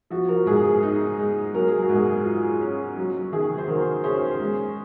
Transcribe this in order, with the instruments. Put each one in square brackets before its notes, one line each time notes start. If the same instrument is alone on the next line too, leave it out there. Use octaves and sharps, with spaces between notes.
[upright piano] F3 F#4
F#4 A#4
G#2 G#4
G#4
D#4
G#3
F#3 A#4
G#4
F#4
G#2
G#4
F4
C#4
F#3
D#3 G#4
C5
D#3 F#4 A#4
C#4 G#4 C5
G#3